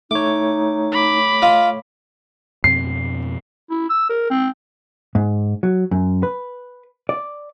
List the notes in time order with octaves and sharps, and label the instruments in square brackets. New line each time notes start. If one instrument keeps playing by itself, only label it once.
[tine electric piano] A3 C#5 [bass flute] D#4 [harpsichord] D6
[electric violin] B5 D6
[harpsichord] F4 D#5 F5
[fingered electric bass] F2 B2 C4 [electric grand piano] C7
[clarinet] E4
E6
A#4
C4
[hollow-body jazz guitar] G#2
F#3
F#2
B4
D5